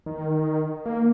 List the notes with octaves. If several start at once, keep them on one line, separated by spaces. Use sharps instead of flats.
D#3
A#3